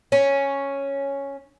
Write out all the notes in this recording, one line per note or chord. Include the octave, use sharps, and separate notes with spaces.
C#4